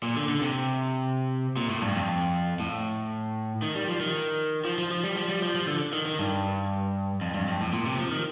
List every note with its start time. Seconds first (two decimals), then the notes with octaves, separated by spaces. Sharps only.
0.03 A#2
0.16 D3
0.29 D3
0.42 C3
1.56 A#2
1.70 A2
1.82 G2
1.95 F2
2.60 A2
3.62 D#3
3.75 G3
3.88 F3
4.00 D#3
4.65 F3
4.78 F3
4.91 F3
5.04 G3
5.16 F3
5.29 G3
5.42 F3
5.55 F3
5.67 D3
5.93 D#3
6.06 D#3
6.19 G2
7.21 F2
7.34 G2
7.48 F2
7.61 A2
7.73 A#2
7.86 C3
7.98 F3
8.11 D#3